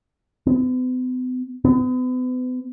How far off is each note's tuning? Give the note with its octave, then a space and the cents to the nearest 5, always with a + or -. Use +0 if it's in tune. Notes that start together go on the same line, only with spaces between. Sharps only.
B3 +45
B3 +40